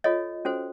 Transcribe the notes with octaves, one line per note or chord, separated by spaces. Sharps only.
F4 A4 C#5 D#5
C#4 F#4 A4 C5